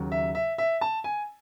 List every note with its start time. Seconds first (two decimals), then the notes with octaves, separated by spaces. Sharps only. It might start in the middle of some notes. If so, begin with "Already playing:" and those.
Already playing: D#2 C#3 F#3
0.12 E5
0.35 E5
0.58 E5
0.81 A5
1.04 G#5